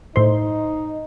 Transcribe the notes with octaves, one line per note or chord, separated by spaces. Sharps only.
A2 D#4 C5